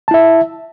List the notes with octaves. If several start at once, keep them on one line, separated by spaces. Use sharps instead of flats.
E4 E5 A5